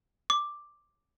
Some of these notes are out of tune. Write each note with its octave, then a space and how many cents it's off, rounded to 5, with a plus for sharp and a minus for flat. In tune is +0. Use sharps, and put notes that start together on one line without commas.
D6 +5